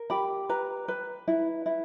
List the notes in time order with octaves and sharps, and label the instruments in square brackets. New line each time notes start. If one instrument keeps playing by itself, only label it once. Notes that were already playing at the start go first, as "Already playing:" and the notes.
Already playing: [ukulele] A#4
G4 B5
B4 A#5
B4
E4
E4